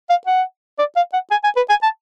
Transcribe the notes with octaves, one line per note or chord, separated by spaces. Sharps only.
F5
F#5
D5
F5
F#5
G#5
G#5
B4
G#5
A5